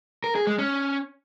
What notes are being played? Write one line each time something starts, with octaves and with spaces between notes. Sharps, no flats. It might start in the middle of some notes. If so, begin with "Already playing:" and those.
A#4
G#4
G#3
C#4